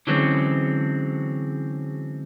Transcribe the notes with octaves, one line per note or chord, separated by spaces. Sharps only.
D3 E3 F#3 G#3 C4 C#4